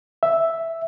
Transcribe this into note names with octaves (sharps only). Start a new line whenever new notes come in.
E5